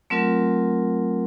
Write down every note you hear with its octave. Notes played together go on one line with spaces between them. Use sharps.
F#3 A3 C4 F4 A#4